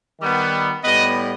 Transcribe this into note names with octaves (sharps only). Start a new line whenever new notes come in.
D#3 G3 B3
A2 G3 B3 B4 D#5